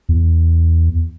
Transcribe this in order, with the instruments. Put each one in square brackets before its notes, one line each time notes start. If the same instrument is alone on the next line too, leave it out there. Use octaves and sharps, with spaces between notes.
[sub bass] E2